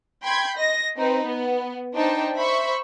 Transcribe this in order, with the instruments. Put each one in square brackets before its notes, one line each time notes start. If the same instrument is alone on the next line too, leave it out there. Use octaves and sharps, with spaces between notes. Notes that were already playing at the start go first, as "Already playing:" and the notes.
[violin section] G5 B5 C6 G6 G#6
D#5 A#6
C4 D#4 B4
B3
D4 D#4 C5 G5 A5
C5 E5 B5 C#6